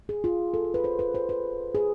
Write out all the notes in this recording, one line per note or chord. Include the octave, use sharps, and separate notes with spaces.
G#4
F4
A4
A4
B4
C5
B4
C5
B4
G#4